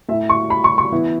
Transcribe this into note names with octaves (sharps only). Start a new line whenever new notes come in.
A2 A3 E4 E5
C#6
B5
C#6
C#6
E3 B3 E4